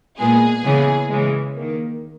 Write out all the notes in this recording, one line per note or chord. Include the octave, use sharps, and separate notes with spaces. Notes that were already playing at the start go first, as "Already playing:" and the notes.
A#2 G#3 B3 G#4
C#3 E3 G#3 B3
C#3 E3 G#3
D#3 A#3